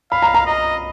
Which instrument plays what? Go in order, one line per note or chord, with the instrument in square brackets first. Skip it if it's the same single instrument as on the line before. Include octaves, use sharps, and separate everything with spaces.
[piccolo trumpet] F5 [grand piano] B5
[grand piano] A#5
A#5
[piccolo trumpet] D#5